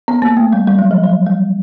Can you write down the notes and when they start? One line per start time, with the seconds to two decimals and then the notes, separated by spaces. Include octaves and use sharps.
0.08 B3
0.22 A#3
0.37 A3
0.53 G3
0.67 G3
0.79 F#3
0.91 F3
1.04 F#3
1.27 G3